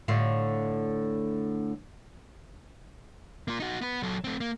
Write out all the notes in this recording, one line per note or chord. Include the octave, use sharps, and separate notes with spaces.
A2 D3 F4
A#3 F4
D#4 F#4
B3 B4
F#3 A4
A3 C4
A#3